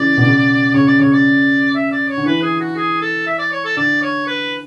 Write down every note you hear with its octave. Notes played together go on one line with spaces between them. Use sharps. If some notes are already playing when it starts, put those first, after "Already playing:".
Already playing: C#3 E3 D5
B2
C#3
C#3 C#5
D5
C#3 C#5
D5
E5
D5
C#5
D3
E3 B4
G#4
F#4
G#4
A4
E5
D5
C#5
A4
D3 D5
C#5
B4